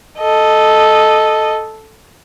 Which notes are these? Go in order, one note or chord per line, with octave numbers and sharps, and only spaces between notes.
A4 D#5